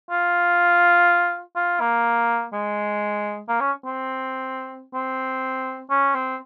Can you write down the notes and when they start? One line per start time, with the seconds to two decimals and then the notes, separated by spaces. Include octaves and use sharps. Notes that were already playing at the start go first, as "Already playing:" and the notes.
0.11 F4
1.56 F4
1.81 A#3
2.53 G#3
3.49 A#3
3.61 C#4
3.86 C4
4.94 C4
5.90 C#4
6.15 C4